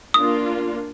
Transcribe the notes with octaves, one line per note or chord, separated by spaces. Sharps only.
A#3 D4 F4 D#6